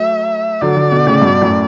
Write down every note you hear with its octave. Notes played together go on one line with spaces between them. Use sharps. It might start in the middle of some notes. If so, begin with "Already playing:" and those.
Already playing: F#3 A3 E5
D3 F#3 D5
D3 F#3
B2 D3
A2 C#3
G2 B2
F#2 A2